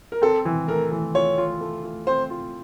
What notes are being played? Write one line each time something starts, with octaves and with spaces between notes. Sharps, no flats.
A#4
C4 A4
E3
A3 A#4
E3
F4 C#5
F4
A3
F4
C4 C5
F4